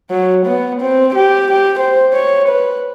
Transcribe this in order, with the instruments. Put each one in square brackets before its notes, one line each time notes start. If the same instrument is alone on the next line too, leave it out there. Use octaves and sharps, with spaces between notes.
[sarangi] F#3
B3
C4
G4
G4
C5
C#5
B4